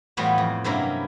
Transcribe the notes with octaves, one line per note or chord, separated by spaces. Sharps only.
A2 E3 G3 B3 F4 F#4
F2
G2 C3 F#3 A#3 C#4 E4